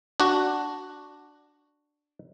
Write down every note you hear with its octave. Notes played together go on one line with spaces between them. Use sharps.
D4 F#4